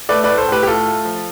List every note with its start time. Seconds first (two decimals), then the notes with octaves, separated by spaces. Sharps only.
0.09 A3 B4 D5
0.24 A2 B4 D5
0.38 A4 C5
0.48 A2 G4 B4
0.63 G4
0.67 A2 F4 A4
0.87 A3
1.05 F3